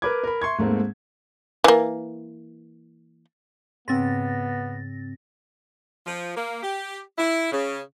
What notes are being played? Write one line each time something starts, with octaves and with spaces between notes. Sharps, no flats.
A#4 B4 B5 D6 G#6
A#4 B5
E5 C6 C#6 G#6
G#2 A3 A#3 C4
E3 A#3
G#2 C#3 B3 C4 A6 A#6
F3
A#3
G4
E4
C#3